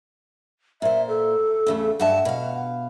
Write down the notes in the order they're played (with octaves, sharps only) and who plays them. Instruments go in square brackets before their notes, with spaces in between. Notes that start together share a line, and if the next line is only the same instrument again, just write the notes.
[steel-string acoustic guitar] A#2 C5 [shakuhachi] E5
[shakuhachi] A4
[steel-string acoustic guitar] E2 C#3 A3
[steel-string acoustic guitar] G2 E5 A5 [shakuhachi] F#5
[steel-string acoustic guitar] B2 F5